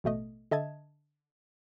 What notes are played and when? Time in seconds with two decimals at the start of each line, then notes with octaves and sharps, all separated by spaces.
0.04 A1 B2 A3 D#5
0.51 D3 D#5 E5 A5 G#6